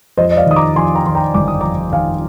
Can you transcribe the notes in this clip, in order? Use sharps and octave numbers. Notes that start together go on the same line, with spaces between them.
F2 C5 D#5
D#5
D5 F5
D#3 D#6
A#5 D6
F2 G#5 C6
G5 A#5
D#3 C6
G5 A#5
G1 D6
D#6
F2 A#5 D6
D#3 F5 G#5